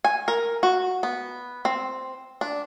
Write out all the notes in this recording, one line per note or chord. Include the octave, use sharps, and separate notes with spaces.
G#5
A#4
F#4
B3
C4
D4